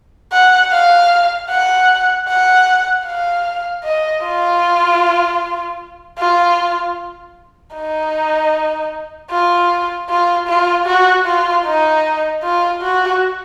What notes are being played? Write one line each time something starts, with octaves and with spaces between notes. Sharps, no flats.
F#5
F5
F#5
F#5
F5
D#5
F4
F4
D#4
F4
F4
F4
F#4
F4
D#4
F4
F#4